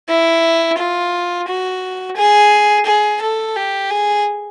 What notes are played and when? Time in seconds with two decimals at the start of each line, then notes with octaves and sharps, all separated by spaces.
0.09 E4
0.78 F4
1.47 F#4
2.16 G#4
2.86 G#4
3.22 A4
3.56 G4
3.90 G#4